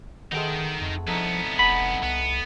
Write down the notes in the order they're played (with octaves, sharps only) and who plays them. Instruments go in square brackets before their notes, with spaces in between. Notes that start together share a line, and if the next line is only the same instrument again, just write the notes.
[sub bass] D#3 [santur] G#3 A3 B3 [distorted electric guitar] D#4 G5
[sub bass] F2
[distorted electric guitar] C2 B3 [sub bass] F3 [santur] A3 D#4
[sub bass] F1 [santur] F#5 A5 [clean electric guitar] B5
[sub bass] C2 [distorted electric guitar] B3